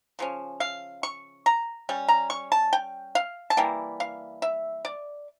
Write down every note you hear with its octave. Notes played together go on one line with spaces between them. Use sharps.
C#3 F3 C#4
F5
C#6
A#5
G3 C#4
A#5
C#6
A5
G5
F5
A5
E3 G3 A#3 G5
F5
E5
D5